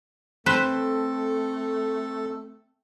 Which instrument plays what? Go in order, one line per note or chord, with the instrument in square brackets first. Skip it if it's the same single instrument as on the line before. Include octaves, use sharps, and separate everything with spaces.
[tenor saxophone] A3 [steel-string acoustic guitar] C4 [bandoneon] A4 [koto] B4 C5